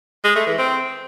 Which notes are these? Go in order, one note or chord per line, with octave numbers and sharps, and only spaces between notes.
G#3
A3
E3
C4